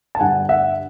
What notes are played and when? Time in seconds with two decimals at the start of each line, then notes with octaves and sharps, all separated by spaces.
0.15 A5
0.19 G2 D3 G3 F#5 G#5
0.49 E5 F#5